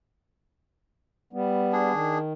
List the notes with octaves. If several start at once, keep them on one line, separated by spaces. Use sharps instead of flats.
G3 B3
D4 G#4
D#3